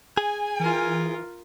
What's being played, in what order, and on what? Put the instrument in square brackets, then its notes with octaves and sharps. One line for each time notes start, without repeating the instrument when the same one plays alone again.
[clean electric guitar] G#4 [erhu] G#5
[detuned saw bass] E3 [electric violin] F4 A#4